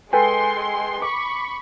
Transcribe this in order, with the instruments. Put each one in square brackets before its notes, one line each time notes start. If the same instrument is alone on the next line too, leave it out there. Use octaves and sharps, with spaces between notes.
[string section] G#3 C6 [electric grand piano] A4 B4 G5 [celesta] G#5
[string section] B5 C#6 [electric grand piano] D6